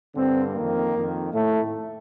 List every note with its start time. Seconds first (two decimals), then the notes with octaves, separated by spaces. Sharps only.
0.15 G2 D3 C4
0.55 F2 D#3 A#3
0.94 F2 D#3
1.33 A2 A3